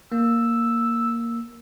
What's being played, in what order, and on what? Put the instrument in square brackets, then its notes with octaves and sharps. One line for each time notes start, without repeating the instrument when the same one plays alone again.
[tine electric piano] A#3 [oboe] E6